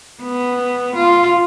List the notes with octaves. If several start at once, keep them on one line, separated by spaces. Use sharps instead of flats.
B3
F4